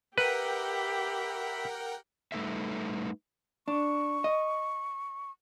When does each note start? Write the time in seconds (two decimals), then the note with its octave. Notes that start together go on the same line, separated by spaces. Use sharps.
0.18 G4 A#4 B4 E5 F#5 G5 B5
2.32 G3 A3 D#4 A4 B4 E5
3.68 D4 C#6
4.24 D#5